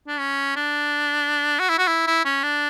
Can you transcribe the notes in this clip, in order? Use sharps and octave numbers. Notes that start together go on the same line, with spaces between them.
D4
C#4
D4
F#4
E4
F#4
E4
E4
C#4
D4